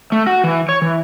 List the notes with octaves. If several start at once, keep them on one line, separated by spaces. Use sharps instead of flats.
A3
F#4
E3
C#5
E3